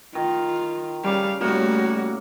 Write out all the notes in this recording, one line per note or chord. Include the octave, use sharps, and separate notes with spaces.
D#3 F4
C#3 G3 F5 D6
A2 G3 A#3 F#4